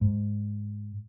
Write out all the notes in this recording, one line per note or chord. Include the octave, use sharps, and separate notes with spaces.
G#2